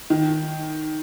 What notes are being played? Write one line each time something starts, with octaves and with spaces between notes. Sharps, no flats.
D#3